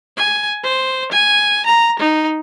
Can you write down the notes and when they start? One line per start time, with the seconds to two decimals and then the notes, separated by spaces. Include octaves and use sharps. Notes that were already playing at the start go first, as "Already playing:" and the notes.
0.17 G#5
0.64 C5
1.11 G#5
1.66 A#5
1.99 D#4